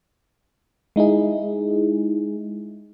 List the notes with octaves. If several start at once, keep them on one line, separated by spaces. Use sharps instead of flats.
G#3 D#4 E4 G#4